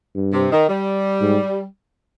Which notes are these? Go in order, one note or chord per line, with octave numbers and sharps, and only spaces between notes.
G2
C3
D#3
G3
G#2